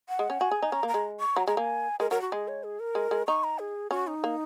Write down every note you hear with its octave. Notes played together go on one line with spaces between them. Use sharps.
F#5
G#3
C#4
F#4 G#5
G#4
D#4
C#4 A#5
A#3
A#5
G#3
C#6
F#3 A#5
G#3 A#5
A#3 G#5
G#3 A#4
F#3 A#4
F#4
G#3 G#4
C#5
G#4
A#4
G#3
G#3
D#4 C#6
A#5
G#4
C#4 F#4
D#4
A#3